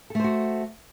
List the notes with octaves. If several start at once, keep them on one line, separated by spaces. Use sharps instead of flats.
A3 F#4 A4 C5